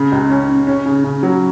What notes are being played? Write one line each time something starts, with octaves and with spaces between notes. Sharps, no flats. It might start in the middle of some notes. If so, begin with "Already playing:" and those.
Already playing: C#3
C#2
C#4
C#4
C#4
C#3
C#3
F#3